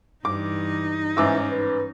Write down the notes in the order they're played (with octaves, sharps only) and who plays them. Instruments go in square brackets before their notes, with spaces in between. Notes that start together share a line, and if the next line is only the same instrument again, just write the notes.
[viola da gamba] G2 E3 [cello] D#4 [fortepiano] D6
[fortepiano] G#2 D6 E6 [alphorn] E3 [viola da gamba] C#4
[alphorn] B4